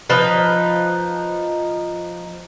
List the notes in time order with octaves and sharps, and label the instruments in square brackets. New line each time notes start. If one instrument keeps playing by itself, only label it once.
[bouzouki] F3 D#4 B4